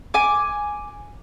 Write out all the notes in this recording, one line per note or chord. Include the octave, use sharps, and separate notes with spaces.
G#5 D6